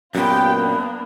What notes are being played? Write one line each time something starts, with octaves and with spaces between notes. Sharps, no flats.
F#2 A#2 B3 F4 G4 G5
A#3 D4